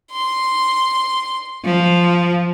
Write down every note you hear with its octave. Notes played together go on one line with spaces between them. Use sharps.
C6
F3